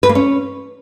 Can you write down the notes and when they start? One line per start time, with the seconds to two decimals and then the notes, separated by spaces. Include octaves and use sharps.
0.03 B4
0.09 A#3
0.15 C#4